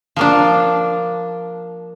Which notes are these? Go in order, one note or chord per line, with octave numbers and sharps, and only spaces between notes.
F3 A#3 D4